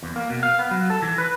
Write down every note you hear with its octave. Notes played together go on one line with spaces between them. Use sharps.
E2
A#3
B2
F5
B3
F#3
A4
E3
B4